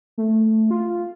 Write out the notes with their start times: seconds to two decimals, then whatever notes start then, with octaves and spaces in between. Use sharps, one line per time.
0.18 A3
0.71 F4